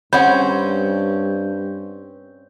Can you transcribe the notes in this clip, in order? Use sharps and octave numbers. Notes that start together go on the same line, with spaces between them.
G2 C4 C#4 G#4 F#5 B5 G6